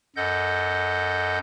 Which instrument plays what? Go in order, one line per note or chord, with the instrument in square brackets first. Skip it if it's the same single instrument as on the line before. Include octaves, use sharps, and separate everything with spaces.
[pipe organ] F#2 A4 D#5 F#5 G6